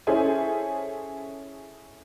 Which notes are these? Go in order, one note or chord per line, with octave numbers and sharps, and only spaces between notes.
C#4 E4 G#4 A4 C5 G#5